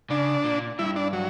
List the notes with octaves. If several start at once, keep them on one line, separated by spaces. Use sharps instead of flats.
C#3 D4
A#2
G2 E4
D4
F#3